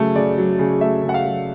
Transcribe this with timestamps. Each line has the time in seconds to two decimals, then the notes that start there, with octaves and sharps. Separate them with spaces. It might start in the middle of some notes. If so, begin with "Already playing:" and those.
Already playing: C#3 F#3 A3
0.15 C#3 D5
0.38 F#3
0.59 C#3
0.81 A3 E5
1.03 C#3
1.09 F#5
1.14 F5
1.25 F#3